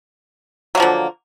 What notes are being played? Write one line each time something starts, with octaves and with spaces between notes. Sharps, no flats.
D3 F3 F#3 A#3